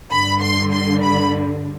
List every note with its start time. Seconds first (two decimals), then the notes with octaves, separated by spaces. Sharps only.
0.10 G2 D3 B5
0.42 C6
0.72 C6
1.03 B5